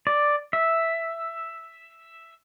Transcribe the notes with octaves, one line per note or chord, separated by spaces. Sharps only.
D5
E5